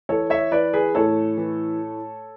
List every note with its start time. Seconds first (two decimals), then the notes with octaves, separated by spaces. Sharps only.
0.09 E3 A4 C#5
0.30 C#5 E5
0.52 E3 B4 D5
0.73 G#4 B4
0.95 A2 A4 C#5
1.37 E3